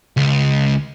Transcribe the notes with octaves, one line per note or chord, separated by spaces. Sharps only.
C#2